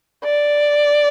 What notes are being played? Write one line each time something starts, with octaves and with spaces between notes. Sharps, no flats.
D5